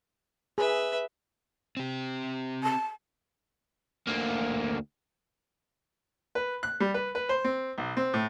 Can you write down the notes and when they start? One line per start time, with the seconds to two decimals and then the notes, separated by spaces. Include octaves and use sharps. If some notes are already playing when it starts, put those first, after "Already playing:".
0.58 G#4 B4 E5
1.77 C4 G4
2.63 A5
4.07 D2 A#3
6.35 B4
6.63 F#6
6.80 G3
6.94 B4
7.15 B4
7.29 C5
7.44 C4
7.78 B1
7.97 C4
8.14 A2